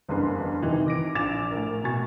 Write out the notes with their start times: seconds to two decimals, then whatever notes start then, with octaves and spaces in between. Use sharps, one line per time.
0.08 F#1 E2 G2 A#4 B4 C6
0.62 C3 D#3 E3 C4 D#4
0.86 D6 A#6 D7
1.15 A#1 D6 A6 E7 F7
1.51 A2 A#4
1.84 B2 G#5 C#6 A6